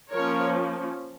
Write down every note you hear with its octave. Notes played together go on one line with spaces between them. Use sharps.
F3 A#3 C#4 A#4 C#5